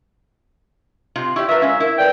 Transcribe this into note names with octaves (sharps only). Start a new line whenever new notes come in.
C3 F4 F#7
E4 G4 D5 C#6
F4 A#4 B4 E5
G#3 C#4 E5 F5
E4 A#4
B4 D5 G5